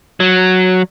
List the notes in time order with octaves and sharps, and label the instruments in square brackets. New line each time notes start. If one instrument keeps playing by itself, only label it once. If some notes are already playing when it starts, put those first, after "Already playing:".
[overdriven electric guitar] F#3